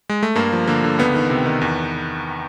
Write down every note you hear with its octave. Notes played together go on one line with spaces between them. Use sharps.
G#3
A3
G2 A#3
F3
D3 A#3
D3
C#2 B3
D#3
C3
D#3
E2